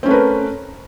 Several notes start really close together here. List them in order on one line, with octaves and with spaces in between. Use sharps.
C4 C#4 A3 B4 A#4